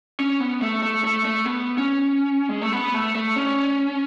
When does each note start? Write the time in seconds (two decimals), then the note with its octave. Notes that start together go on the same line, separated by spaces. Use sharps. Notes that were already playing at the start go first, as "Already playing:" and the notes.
0.20 C#4
0.40 B3
0.62 A3
0.82 A3
1.04 A3
1.25 A3
1.45 B3
1.78 C#4
2.49 G#3
2.61 A3
2.72 B3
2.94 A3
3.15 A3
3.36 C#4